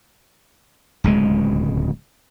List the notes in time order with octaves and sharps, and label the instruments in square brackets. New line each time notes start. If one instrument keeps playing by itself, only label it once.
[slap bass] D1 C#2 B2 G#3